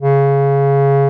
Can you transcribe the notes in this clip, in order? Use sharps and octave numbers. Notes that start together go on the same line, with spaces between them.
C#3